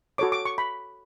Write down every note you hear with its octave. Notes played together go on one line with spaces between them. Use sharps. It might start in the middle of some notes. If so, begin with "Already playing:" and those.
F#4 A4 C#5 D6
D6
C#6
B5